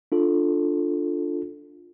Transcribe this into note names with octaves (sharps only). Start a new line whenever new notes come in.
D4 F4 A4